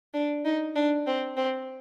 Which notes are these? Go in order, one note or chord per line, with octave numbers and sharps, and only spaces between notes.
D4
D#4
D4
C4
C4